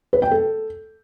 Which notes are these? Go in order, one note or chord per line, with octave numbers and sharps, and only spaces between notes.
B4
G5
A4